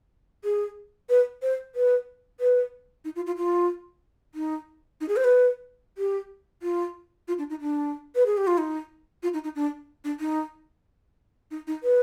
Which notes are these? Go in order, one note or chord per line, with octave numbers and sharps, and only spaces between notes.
G#4
B4
C5
B4
B4
D#4
F4
F4
F4
D#4
D#4
G#4
C5
B4
G4
F4
F4
D4
D#4
D4
B4
G#4
G4
F4
D#4
F4
D#4
D#4
D4
D4
D#4
D#4
D#4
B4